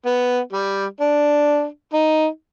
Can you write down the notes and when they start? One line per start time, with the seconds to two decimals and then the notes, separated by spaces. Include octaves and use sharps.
0.06 B3
0.52 G3
1.00 D4
1.93 D#4